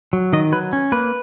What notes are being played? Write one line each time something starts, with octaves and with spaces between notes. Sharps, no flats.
F#3
D#3 D#5
F#3 B4
C#4
A#3 B4